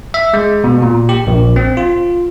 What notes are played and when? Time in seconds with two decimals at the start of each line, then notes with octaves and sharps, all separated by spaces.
0.14 E5
0.34 G#3
0.64 B2
0.82 A#2
1.09 G4
1.27 A#1
1.56 C4
1.77 F4